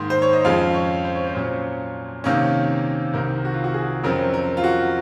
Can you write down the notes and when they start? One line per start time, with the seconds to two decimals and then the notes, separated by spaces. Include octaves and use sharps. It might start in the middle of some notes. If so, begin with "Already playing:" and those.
Already playing: G#2 D#3 A#3 C6
0.10 C5
0.22 C#5
0.33 D#5
0.45 F2 C#3 F3 G#3 F5
0.74 C#5
1.05 C5
1.15 C#5
1.27 C5
1.35 A#2 F#3 C#4
2.24 C3 D#3 A#3 C#4
3.14 C2 C3 D#3 A#4
3.45 F#4
3.54 F4
3.64 F#4
3.74 G#4
4.03 F2 C#3 F#3 C4 A#4
4.34 A#4
4.57 F4
4.64 F#4